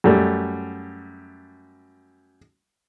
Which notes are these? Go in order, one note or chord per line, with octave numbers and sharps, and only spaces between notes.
F#2 G3 A3